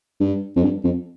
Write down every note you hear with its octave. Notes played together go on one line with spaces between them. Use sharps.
G2
F2
G2
F2